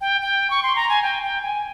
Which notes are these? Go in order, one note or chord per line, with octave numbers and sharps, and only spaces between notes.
G5
G5
C#6
C6
A#5
G#5
G5
G5
G#5